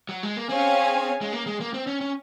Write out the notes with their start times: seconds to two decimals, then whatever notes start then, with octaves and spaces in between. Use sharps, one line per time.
0.09 F#3
0.23 G#3
0.37 A#3
0.49 C4 C#4 G#4 C#5 F5 G#5
1.21 G#3
1.33 A#3
1.46 G#3
1.60 A#3
1.74 C4
1.87 C#4
2.01 C#4